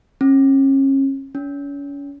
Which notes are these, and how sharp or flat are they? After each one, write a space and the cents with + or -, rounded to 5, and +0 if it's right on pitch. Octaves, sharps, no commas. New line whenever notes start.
C#4 -35
C#4 +35